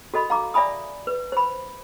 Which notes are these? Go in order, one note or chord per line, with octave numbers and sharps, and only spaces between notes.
F#4 A4 D#5 B5
F5 A#5 D6
D5 E5 G#5 B5 D#6
B4
C5 B5